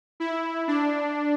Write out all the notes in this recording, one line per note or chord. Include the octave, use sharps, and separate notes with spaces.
E4
D4